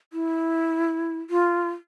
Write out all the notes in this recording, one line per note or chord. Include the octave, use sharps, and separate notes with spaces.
E4
F4